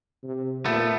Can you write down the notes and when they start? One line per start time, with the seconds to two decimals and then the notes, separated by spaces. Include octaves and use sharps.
0.24 C3
0.65 A#2 A3 B3